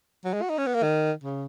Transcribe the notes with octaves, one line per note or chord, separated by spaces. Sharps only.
F#3
G#3
F#4
D#4
C#4
B3
A#3
D#3
C#3